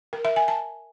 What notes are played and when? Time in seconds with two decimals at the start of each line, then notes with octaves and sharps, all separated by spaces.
0.13 A#4
0.25 E5
0.36 G#5
0.48 A5